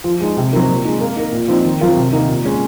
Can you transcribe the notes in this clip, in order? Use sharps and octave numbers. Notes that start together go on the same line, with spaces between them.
F3
G#3 D#4
C3
F#3 C4 D#4 A#4
A#2
G#3 D#4
A#3
D#4 A#4
A#2
F3 C4 D#4
D#3
F#3 C4 F4 A#4
C3
D#3 A#3 D#4
A#2
G#3 C#4